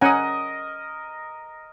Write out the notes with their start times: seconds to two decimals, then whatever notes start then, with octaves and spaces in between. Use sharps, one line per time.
0.01 C#4 A#4 D#5 F#5 G#5